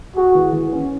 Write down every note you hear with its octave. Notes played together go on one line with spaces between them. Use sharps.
F#4 G#4
E3
E3
C#4